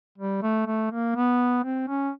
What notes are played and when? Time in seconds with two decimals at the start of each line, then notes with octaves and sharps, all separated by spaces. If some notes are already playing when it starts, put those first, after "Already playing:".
0.18 G3
0.42 A3
0.67 A3
0.91 A#3
1.16 B3
1.64 C4
1.88 C#4